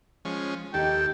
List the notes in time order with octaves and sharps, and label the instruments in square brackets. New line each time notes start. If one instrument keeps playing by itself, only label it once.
[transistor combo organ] F3 G#3 C#4
[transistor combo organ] D#2 A4 [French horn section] D#4 G4 [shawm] G5